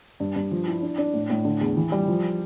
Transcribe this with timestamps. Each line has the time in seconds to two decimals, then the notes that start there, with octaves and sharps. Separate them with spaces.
0.20 G2
0.36 G2
0.51 F3
0.68 E4
0.83 D4
0.98 D4
1.14 A2
1.30 A2
1.45 D3
1.61 E2
1.76 E3
1.92 G3
2.08 F3